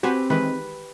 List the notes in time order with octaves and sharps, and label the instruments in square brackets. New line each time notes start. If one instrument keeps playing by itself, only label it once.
[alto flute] C4 [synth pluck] F#4 C5 G#5 [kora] G4 B4
[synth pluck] D#3 E3 G#3 [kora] B4